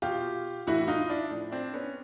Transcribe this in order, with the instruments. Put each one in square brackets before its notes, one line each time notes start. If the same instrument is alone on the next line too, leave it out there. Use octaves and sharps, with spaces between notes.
[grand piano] B2 F4 G4
A2 E3 E4 F#4
D#4 F4
D4 E4
A2 F3
C4 D4
B3 C#4